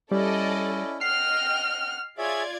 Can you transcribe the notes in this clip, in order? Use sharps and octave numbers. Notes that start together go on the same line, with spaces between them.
G3 C#4 E4 A4 D5 D#5
D#5 F#5 G5 F6 C7
F4 G#4 C#5 D5 E5 G#6